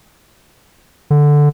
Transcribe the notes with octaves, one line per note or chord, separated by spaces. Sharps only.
D3